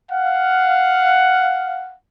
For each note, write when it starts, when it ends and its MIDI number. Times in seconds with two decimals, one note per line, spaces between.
0.11 1.94 77
0.11 1.94 78